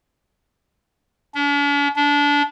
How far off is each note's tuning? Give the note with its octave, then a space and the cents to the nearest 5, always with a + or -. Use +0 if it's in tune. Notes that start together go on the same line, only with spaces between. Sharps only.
D4 -45
D4 -25